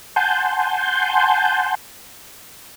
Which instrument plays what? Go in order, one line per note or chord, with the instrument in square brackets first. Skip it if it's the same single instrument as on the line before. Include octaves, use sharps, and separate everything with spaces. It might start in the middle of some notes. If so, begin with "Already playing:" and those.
[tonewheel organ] F#5 G#5 A5 C6 G6